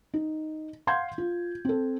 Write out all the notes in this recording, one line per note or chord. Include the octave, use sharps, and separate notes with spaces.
D#4
F5 F#5 C6 G6 G#6
F4
C4 A4